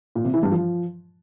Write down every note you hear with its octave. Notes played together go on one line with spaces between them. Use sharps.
A#2
C3
E3
G2
F3